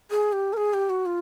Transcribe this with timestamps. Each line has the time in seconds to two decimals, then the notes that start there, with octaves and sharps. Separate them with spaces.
0.11 G#4
0.33 G4
0.53 A#4
0.57 G#4
0.74 G4
0.90 F#4
1.06 F4